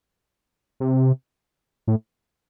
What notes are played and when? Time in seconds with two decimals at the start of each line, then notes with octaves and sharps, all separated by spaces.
0.80 C3
1.87 A2